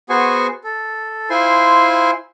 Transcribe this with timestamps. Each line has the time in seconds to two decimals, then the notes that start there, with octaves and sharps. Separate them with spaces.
0.10 B3 F#4 G#4 C5 G#5 C#6
0.64 A4
1.30 E4 F4 C5 G#5 C6